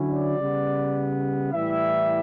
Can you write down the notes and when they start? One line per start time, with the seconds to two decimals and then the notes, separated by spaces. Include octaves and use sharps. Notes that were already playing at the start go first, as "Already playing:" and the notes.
Already playing: D3 F#3 C#4 E4
0.10 D5
0.38 C#3 G3 B3
1.51 A2 E3 G3 E5